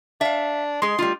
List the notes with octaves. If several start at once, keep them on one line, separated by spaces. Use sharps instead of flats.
D4 E5 F5
G#3 G#4 C6
G3 A3 F4